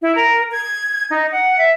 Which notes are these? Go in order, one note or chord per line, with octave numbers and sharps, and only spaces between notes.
E4
A#4
G#6
D#4
F#5
E5